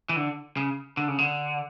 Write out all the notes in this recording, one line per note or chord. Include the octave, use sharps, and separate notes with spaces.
E3
D3
C#3
D3
C#3
D3